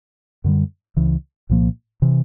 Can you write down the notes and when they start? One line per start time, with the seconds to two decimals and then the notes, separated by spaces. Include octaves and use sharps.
0.44 F#2 D3 G3
0.97 C#2 C#3 E3
1.49 C2 A#2 F3 A#3
2.02 C3 E3